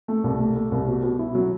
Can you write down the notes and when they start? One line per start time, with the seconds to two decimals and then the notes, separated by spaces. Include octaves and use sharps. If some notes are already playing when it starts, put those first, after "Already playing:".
0.08 A3
0.24 C2
0.40 A3
0.56 A3
0.72 C2
0.88 B2
1.03 B2
1.19 E4
1.35 F#3